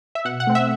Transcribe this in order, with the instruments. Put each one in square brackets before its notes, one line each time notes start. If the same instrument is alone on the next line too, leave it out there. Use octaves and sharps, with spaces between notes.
[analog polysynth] E5
B2 F#5
F#5
A3 C4
E5